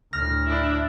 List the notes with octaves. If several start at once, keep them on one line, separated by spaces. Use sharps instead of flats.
D2 A2 F6 A#6
D4 E4